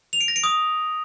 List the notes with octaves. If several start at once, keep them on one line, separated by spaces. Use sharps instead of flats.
F7
D7
A#6
D7
D#6